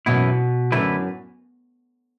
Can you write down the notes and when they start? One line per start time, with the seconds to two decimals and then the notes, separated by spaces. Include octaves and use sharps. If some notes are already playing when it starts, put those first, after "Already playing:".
0.06 F#2 B2 E3 B3 E4
0.72 F#2 D3 A3 E4 B4